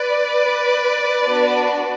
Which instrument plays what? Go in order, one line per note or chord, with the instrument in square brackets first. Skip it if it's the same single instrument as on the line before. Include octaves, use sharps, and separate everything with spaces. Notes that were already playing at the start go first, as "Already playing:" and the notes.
Already playing: [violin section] B4 D5
B3 D4 F#4